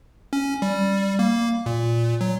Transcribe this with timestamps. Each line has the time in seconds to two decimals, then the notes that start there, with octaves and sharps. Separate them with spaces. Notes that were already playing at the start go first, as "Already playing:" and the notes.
0.33 C#4
0.62 G3
1.19 A#3
1.66 A#2
2.21 F#3